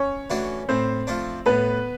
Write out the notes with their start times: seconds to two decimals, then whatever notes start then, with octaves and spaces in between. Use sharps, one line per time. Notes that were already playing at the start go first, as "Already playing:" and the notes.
Already playing: C#4 C#5
0.30 E3 A3 D4 F#4
0.69 A2 C4 C5
1.07 F3 A3 D4
1.46 A2 B3 B4